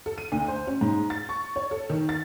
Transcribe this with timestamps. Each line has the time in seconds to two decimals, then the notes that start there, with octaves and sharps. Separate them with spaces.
0.06 A4
0.18 D#7
0.32 D2
0.48 C5
0.67 C#4
0.81 G#2
1.10 A6
1.29 C#6
1.56 C#5
1.71 A4
1.90 D#3
2.09 A6